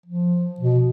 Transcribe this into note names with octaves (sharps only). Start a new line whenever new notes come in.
F3
B2